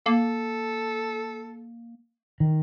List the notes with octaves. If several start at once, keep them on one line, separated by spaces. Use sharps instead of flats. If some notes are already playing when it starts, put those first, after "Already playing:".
A#3 A4
D#3